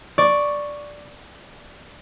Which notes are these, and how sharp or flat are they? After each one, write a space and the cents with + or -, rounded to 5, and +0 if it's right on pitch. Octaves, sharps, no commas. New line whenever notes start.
D5 +0 C#6 +0